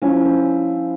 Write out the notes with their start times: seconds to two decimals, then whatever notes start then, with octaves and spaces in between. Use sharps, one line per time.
0.02 F3 C#4 E4
0.25 C5